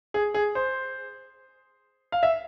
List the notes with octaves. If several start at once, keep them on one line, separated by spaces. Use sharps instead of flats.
G#4
G#4
C5
F5
E5